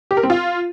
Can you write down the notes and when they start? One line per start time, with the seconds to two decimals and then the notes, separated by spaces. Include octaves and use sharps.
0.11 G4
0.17 A#4
0.23 C4
0.30 F4